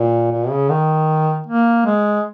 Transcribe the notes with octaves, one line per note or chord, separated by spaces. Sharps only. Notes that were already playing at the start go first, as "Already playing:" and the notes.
Already playing: A#2
A#2
C#3
D#3
A#3
G#3